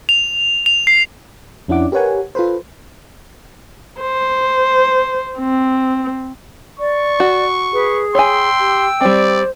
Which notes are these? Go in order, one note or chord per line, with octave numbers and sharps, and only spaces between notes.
F7
F7
C7
F2 C#4 D4 E4 F#5 D6
G4 A#4 B4 C#5 F#5 G#5
F4 A4 B4 C5
C5
C4
D5 C#6
F#4
G#4 B4
C#5 G5 G#5 C6 E6
G4
G3 C4 C5 D5